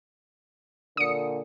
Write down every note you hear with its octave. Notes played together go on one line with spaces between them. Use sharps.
A#2 D3 D#6 C#7